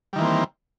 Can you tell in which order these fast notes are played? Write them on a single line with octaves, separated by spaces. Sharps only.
G3 D#3 E3 A#3 C4